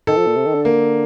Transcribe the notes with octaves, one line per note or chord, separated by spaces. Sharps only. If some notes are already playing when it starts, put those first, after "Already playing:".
D#3 A4
F3
A#2
C3
D#3
D3
A#3